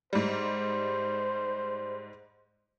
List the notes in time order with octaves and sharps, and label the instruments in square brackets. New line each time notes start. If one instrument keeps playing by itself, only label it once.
[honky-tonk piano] G#2 G3 [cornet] C5